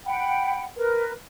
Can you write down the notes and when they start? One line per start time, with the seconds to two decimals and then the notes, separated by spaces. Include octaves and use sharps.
0.05 F#5 G5 B5
0.77 A#4 B4